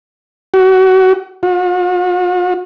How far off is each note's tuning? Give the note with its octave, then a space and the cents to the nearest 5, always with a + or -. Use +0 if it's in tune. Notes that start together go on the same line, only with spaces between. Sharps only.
F#4 +30
F#4 -45